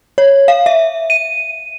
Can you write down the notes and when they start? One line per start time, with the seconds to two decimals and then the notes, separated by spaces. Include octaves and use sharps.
0.18 C#5
0.48 F5
0.66 E5
1.10 D#7